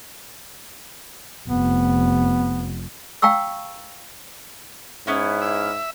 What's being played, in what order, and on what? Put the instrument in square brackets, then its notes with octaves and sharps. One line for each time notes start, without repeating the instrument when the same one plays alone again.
[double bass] F1 [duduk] B3
[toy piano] F5 G5 A#5 C#6 E6
[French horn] G#2 [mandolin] B3 C#4 E4
[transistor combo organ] E5